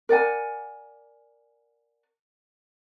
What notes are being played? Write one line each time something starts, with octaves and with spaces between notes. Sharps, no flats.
A#4 D5 F#5 G#5